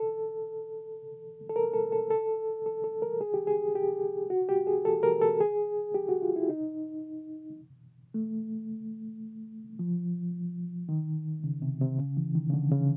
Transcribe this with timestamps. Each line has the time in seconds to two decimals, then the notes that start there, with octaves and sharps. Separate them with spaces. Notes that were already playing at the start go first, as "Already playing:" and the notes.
Already playing: A4
1.49 A4
1.56 A#4
1.74 A4
1.92 A4
2.10 A4
2.66 A4
2.84 A4
3.02 A#4
3.21 G#4
3.34 G4
3.47 G#4
3.75 G4
4.30 F#4
4.49 G4
4.67 G#4
4.85 A4
5.03 A#4
5.22 A4
5.41 G#4
5.94 G4
6.09 F#4
6.22 F4
6.36 E4
6.49 D#4
8.14 A3
9.79 F3
10.89 D#3
11.44 C#3
11.62 C3
11.81 C3
11.98 C#3
12.17 E3
12.35 D#3
12.50 C#3
12.53 D3
12.72 C#3